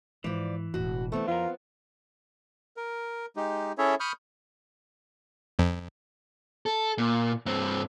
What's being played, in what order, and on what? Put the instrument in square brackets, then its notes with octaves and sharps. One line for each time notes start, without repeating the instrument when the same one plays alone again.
[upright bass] G#2 [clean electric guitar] E3 [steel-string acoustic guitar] F3 D5
[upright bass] E1 A2 [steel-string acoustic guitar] F#4
[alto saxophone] A3 [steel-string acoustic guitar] B3 C4 [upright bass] D#4 E4
[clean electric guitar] F2 A#4 [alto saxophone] F4
[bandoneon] A#4
G#3 D#4 G4
C#4 E4 G#4 A4 C#5 E5
B5 C#6 D#6 F6 G6
[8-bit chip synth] F2
[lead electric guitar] A4
A#2
G2 C4